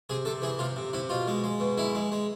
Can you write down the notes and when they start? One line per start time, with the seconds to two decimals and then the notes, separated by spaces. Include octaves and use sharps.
0.10 C3 G#4
0.25 C3 A4
0.42 E3 G#4
0.59 C3 F4
0.76 C3
0.93 C3 E4
1.09 B2 F4
1.28 G#3
1.44 G#3
1.60 B2
1.78 G#3 E4
1.95 G#3
2.12 G#3